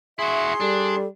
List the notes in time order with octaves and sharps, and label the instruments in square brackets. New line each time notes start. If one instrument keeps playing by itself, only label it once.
[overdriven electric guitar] E4 F#4 [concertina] G#4 C6 [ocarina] E5
[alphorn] G3 [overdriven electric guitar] D4 [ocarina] A4